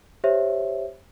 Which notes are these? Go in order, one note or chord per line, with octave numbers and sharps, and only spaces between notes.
G4 C5 C#5 E5